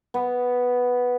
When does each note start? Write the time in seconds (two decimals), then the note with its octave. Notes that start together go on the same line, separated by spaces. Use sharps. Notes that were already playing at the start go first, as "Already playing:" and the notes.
0.14 B3